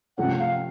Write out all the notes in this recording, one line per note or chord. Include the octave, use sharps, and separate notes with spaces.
C3 F3 A3 C#4 F#5
F5